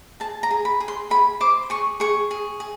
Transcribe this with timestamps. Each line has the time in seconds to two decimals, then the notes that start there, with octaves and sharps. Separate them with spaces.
0.20 G#4 A5
0.43 A#5
0.51 G#4
0.65 B5
0.80 G#4
0.88 C6
1.10 G#4 B5
1.40 C5 D6
1.70 G#4 C#6
2.00 G#4 C#6
2.31 G#4
2.60 G#4